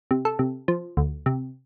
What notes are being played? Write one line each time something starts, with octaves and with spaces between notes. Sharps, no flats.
C3
A4
C3
F3
D2
C3